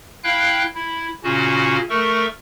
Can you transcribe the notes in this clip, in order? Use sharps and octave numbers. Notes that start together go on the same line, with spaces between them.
E4 F5 G5 F#6
E4
A#2 C#3 C#4 F#4
A3 A4 A#4 C#6